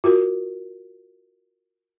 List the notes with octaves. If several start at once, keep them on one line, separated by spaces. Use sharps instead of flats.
F4 F#4 A#4